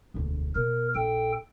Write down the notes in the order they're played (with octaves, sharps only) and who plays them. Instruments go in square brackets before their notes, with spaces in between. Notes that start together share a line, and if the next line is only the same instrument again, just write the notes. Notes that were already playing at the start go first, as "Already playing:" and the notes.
[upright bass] E1 D2
[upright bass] B2 [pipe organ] A#4
[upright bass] A#1 [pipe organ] A4 G5